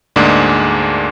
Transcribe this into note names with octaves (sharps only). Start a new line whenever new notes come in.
D2 G#2 G#3 A#3 D4